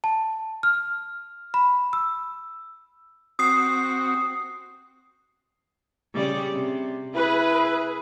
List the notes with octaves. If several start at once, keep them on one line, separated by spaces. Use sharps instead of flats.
A5
F6
B5
E6
C4 F#4 D#6 C7
C#3 G3 D5
C3
E4 G#4 B4